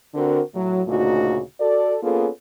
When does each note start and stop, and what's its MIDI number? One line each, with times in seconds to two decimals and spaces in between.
0.15 0.41 50
0.15 0.41 60
0.15 0.41 62
0.15 0.41 66
0.15 0.41 70
0.54 0.81 45
0.54 0.81 54
0.87 1.41 38
0.87 1.41 46
0.87 1.41 49
0.87 1.41 57
0.87 1.41 63
0.87 1.41 66
1.59 1.96 66
1.59 1.96 69
1.59 1.96 74
2.02 2.28 58
2.02 2.28 59
2.02 2.28 61
2.02 2.28 65
2.02 2.28 68
2.02 2.28 69